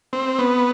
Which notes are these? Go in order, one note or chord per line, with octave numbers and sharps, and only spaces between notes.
C4
B3